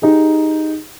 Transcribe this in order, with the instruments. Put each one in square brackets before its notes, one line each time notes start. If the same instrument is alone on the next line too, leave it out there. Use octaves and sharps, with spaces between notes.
[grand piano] D#4 G4 G#4